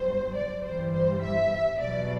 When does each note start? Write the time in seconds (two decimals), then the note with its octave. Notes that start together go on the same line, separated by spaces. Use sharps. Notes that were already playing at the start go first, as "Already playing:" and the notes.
Already playing: G1 G2 F#3 C5
0.36 D5
0.64 G1 G2 E3 G3 C5
0.93 C5
1.22 E5
1.80 E2 B2 F#3 D5